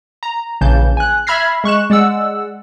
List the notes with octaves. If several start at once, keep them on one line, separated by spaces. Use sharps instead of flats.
A#5
A#1 C#3 E3 A5 G6
G#5 F#6
E5 B5 F6 G#6 A#6 C7
G#3 C#6 F#6 E7
G#3 D5 F#5 E6